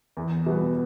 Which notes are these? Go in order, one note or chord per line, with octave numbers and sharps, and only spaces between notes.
E2
B2 G3 B3